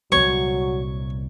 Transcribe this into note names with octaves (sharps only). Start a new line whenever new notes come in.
C2 A#2 F#3 C#5 C#6